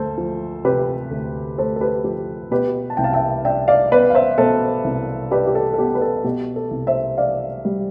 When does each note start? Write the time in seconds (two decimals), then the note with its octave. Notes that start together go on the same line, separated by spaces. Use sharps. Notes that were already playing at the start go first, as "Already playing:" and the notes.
Already playing: D2 A3 A4 C5
0.18 F3
0.65 C3 G4 B4
1.11 D2
1.58 A3 A4 C5
1.76 A4
1.81 G4 B4
2.04 F3 G4
2.51 B2 G4 B4
2.90 A5
2.97 C2 G5
3.04 F5 A5
3.13 E5 G5
3.45 D4 E5 G5
3.68 D5 F5
3.91 B3 B4 D5
4.10 F5
4.15 C5 E5
4.38 B2 A4 C5
4.84 C2
5.31 D4 G4 B4
5.47 G4
5.55 A4
5.74 A4
5.78 B3 G4
5.95 B4
6.02 A4
6.24 B2 G4
6.56 A4
6.71 C2
6.87 C5 E5
7.18 D4 D5 F5
7.65 G3